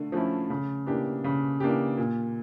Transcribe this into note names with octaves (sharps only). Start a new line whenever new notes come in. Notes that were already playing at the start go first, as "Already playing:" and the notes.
Already playing: D3 A3
F3 A3 C#4 E4
C#3
E3 A#3 D4 G4
C#3
E3 A#3 D4 G4
A#2